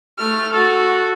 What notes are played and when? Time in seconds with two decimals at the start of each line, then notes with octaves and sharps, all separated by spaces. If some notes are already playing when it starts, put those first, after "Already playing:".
0.18 A3 F6
0.53 F#4 A4